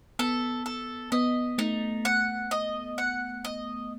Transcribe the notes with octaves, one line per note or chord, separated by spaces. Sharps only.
B3 A4
A4
B3 D#5
A3 D#4
F#5
D#5
F#5
D#5